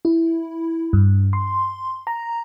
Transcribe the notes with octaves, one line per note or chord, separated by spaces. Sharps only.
E4
G2
C6
A#5